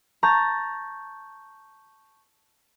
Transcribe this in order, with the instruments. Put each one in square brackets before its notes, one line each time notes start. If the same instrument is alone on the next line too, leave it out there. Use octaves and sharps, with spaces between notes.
[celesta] A5 C#6 G6 [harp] A#5 A6